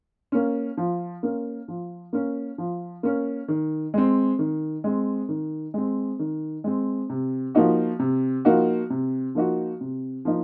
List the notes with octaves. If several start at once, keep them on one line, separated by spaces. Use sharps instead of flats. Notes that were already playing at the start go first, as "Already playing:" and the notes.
A#3 C#4
F3
A#3 C#4
F3
A#3 C#4
F3
A#3 C#4
D#3
G#3 C4
D#3
G#3 C4
D#3
G#3 C4
D#3
G#3 C4
C3
F3 A#3 D#4 F#4
C3
F3 A#3 D#4 F#4
C3
F3 A#3 D#4 F#4
C3
F3 A#3 D#4